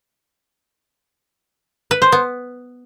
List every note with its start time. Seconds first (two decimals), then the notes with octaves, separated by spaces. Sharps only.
1.91 B4
2.02 C5
2.12 B3